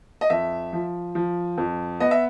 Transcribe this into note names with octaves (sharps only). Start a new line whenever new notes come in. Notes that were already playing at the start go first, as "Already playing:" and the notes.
D#5
F2 E5
F3
F3
F2
B3 D#5
E5